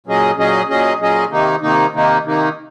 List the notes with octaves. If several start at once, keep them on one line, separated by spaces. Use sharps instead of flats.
A#2 F#3 C#4 G#4 D#5
A#2 F#3 C#4 G#4 D#5
A#2 F#3 C#4 G#4 D#5
A#2 F#3 C#4 G#4 D#5
C3 D#3 A#3 D#4
C3 D#3 A#3 D#4
C3 D#3 A#3 D#4
C3 D#3 A#3 D#4